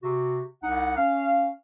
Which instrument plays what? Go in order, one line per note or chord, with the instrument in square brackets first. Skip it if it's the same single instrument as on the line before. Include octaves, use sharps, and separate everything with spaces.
[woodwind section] C3 F#4
C2 D#4 F#5
C#4 F5